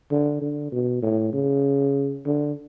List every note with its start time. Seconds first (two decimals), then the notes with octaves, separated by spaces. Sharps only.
0.11 D3
0.42 D3
0.72 B2
1.02 A2
1.33 C#3
2.26 D3